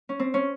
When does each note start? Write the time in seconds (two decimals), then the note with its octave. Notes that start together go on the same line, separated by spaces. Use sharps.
0.09 C#4
0.19 C4
0.34 C#4